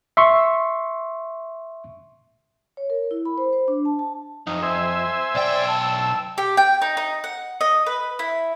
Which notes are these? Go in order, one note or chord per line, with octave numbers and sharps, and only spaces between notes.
E5 C6 C#6
C#5
A#4
E4
B5
C5
C5
D4
A5
A5
F2 D#4
C5 E5 G#5
B1 D5 G5
A5 E6
G4
G5
D#4
D#4
F#5
D#5
B4
E4